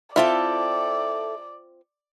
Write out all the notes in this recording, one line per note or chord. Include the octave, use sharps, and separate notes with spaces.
C4 E4 F4 A4 D5 E5 G5